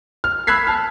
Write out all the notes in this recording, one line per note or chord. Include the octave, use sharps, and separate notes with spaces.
F6
B5 E6 F#6 G#6 B6 C7
A5 F6